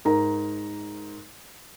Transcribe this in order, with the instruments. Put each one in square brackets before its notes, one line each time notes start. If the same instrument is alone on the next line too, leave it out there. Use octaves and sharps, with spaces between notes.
[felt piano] G#2 A#4 A#5